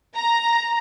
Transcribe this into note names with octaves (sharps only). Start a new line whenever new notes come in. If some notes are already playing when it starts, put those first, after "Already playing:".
A#5